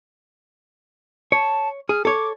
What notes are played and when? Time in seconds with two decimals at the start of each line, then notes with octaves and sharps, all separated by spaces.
1.32 C#5 A5
1.89 G#4 F6
2.05 A4 C#5 D6